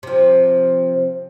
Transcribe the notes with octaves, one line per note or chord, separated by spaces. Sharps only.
C3 F3